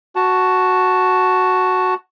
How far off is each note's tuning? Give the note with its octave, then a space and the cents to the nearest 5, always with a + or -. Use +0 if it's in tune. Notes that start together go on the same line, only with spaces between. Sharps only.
F#4 +0 A5 +0